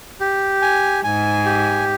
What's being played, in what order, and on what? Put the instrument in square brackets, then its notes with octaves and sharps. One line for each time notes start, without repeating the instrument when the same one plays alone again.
[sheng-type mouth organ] G4
G#5
[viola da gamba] G#2 [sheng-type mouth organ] G#5
[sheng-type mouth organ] G4